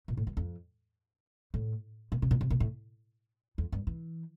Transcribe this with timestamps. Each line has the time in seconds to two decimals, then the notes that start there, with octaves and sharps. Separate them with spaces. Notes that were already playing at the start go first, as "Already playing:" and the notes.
0.08 A#2
0.17 A2
0.27 G2
0.37 F2
1.54 A2
2.12 A#2
2.22 C3
2.31 A#2
2.41 C3
2.50 A#2
2.60 A2
3.58 F2
3.72 G2
3.87 E3